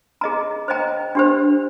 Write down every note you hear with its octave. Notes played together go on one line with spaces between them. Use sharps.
G#4 D#5 A#5
C5 D#5 G5 A#5
D4 G4 C5